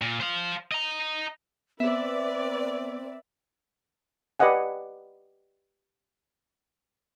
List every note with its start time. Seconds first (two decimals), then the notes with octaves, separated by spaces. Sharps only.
0.02 A#2
0.20 C5 F5
0.72 D#5 A#5
1.80 B3 C4 B4 D5 E5
4.40 G4 B4 D5 D#5 F#5 G#5